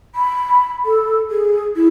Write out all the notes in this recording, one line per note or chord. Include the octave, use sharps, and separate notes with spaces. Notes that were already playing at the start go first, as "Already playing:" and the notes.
B5
A4
G#4
E4